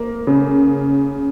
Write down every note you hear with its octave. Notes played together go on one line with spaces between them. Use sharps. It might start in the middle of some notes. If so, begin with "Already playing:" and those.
Already playing: A#3
C#3